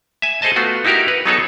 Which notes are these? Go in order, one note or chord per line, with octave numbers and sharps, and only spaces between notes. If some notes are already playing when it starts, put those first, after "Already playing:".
E5 G#5
G#4 A4 C5 D#5 A5
A3 B3 F4 F#4
D#4 E4 F#4 G4 A#4
B4
F#3 B3 D#4 G#4 A4 C#5